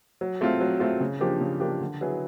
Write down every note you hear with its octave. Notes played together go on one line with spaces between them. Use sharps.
F#3
A3 C4 F4
F#3
A3 C4 F4
C#3
F3 A#3 D4 G4
C#3
F3 A#3 D4 G4
D3
F#3 B3 E4 G#4